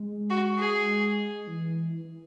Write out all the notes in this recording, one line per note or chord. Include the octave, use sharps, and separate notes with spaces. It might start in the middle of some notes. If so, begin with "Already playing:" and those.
Already playing: G#3
F#4
G#4
E3
E3